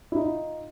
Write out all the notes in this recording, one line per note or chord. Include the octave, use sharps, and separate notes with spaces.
E4
D#4 F4